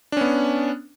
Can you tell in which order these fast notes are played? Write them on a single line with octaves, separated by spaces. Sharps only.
D4 C#4 B3